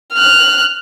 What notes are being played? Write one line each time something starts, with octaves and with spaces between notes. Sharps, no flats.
F6 F#6